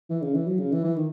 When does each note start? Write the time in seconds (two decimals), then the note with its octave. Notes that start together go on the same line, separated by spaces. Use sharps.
0.10 E3
0.22 C#3
0.34 E3
0.47 F#3
0.59 C#3
0.72 E3
0.84 E3
0.96 D#3